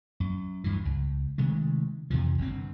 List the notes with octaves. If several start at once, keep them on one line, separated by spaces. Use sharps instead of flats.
F#2
D2 G2 E3
C#2
C3 D#3 G#3 A3
F2 C3 E3 F3
G1 G2 C4